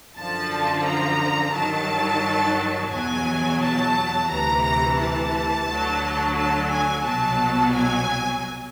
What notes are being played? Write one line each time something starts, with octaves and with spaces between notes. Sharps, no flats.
F#2 D3 F3 A5
A#5
G2 D#3 F#3 A5
E2 B2 F#3 G#5
A5
D2 C3 E3 A#5
A#5
A5
D2 D3 F#3
A5
G#5
C2 B2 F#3 A5
G#5